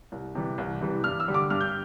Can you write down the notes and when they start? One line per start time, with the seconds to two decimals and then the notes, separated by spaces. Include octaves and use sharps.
0.12 C2
0.35 C3 E3 G3
0.58 C2
0.81 C3 E3 G3
1.04 G2 F6
1.20 E6
1.28 D3 G3
1.34 D6
1.50 G2 F6
1.61 G6